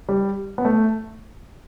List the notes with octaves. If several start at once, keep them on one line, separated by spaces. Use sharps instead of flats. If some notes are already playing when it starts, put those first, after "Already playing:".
G3
B3
A3